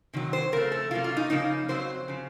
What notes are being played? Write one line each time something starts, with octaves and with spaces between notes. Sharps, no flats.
C3 D#3 F#3
C5
F2 C#3 A3 A#4
A4
C3 F#3 A#3 C#4 F4
F4
D#4
C#3 F3 A#3 C#4 D#4
F2 C#3 F#3 C4 C5
C#3 F3